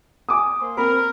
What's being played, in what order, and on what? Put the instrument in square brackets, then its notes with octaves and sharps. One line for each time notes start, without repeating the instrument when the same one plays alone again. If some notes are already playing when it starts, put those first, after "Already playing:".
[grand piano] G#5 D6 D#6
[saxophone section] A#3 C5
[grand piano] C4 B5 [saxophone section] A#4